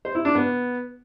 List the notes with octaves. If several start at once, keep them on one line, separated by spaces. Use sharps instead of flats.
C5
E4
D4
B3